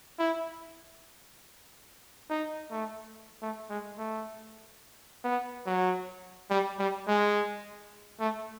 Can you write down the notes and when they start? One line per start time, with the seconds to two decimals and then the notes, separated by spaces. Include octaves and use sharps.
0.19 E4
2.30 D#4
2.71 A3
3.42 A3
3.70 G#3
3.98 A3
5.24 B3
5.66 F#3
6.50 G3
6.79 G3
7.08 G#3
8.20 A3